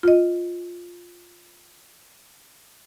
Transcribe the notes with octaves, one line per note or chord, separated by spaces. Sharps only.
F4 D#5